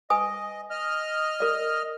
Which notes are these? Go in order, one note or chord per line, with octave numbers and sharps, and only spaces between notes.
B4 D#5 G#5 D#6
D#5 F6
A#4 D5